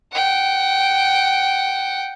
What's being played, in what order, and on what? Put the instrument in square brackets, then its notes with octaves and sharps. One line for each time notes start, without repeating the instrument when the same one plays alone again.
[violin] F#5 G5